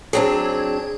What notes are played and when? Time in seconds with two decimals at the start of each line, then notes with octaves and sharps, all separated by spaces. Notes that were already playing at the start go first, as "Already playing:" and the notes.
0.13 F#3 C4 D4 G#4